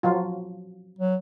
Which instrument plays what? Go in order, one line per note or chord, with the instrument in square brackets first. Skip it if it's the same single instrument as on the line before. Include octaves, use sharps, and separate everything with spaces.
[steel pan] F3 F#3 F4
[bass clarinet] F#3